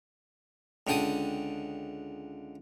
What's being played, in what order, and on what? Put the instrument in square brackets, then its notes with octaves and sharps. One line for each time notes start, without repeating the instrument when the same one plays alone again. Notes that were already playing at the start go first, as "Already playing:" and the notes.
[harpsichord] C#2 D3 G5 A5 D#6